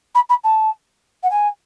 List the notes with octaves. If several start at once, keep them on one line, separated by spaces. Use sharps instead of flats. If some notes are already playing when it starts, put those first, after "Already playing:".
B5
B5
A5
F#5
G#5